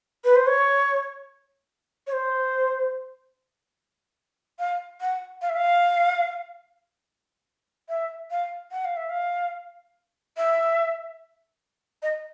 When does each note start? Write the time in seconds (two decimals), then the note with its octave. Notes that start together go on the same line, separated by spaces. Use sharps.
0.24 B4
0.36 C5
0.47 C#5
2.07 C#5
2.12 C5
4.59 F5
5.01 F#5
5.42 F5
5.49 E5
5.56 F5
7.89 E5
8.31 F5
8.71 F#5
8.85 F5
8.97 E5
9.10 F5
10.37 E5
12.03 D#5